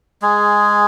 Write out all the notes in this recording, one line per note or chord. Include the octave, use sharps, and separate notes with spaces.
G#3 G#4